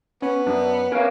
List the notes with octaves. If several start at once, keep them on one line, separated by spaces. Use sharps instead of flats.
B3 C#4
F#2 D4
C#4 A#4 B4 F5